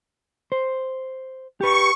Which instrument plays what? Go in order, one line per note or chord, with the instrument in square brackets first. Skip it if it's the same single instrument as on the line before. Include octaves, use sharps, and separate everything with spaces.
[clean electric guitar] C5
[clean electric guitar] G4 B4 [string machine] C#6